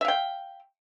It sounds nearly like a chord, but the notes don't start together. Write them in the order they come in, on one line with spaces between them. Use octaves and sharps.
E5 F5 G5